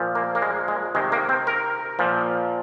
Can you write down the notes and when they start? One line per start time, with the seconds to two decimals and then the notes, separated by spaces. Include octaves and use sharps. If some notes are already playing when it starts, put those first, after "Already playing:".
Already playing: A#2 F3
0.15 A#3
0.35 A#3
0.42 G#3
0.68 G#3
0.95 C3 D#3 G#3
1.12 A#3
1.29 C4
1.47 A#4
1.99 A#2 F3